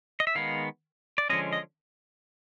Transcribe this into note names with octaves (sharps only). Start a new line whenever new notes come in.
D#5
E5
D#3 G#3 B3 F5
D5
D3 F3 G#3 C#4 D#5
D#5